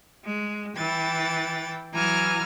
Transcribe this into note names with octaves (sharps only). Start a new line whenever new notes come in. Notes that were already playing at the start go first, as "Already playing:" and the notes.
G#3
E3 G5 A6
E3 F#3 G#5 A#5 F6